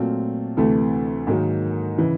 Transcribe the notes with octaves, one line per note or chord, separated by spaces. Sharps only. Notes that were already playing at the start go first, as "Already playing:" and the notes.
Already playing: A#2 F#3 A3 C4 F4
D2 C3 E3 A3
G#2 D#3 F#3 A#3
C#3 E3